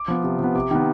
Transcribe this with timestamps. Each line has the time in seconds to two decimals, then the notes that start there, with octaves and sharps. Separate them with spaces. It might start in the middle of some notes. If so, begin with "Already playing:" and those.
Already playing: D6
0.08 F3 B3
0.24 C3
0.39 F3 B3
0.55 C3 D6
0.71 D#3 B3